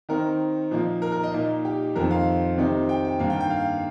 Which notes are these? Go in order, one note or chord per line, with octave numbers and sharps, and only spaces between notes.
D#3 C4 D#4 A#4
A#2 F3 A#3 D#4
A#4
A#4
D#5
A#2 A#3 D#4
G4
F2 D#3 C4 D#4 A#4
F5
C3 D#3 C4 D#4
G5
G5
G2 D#3 A#3 F5
G5
G5
F5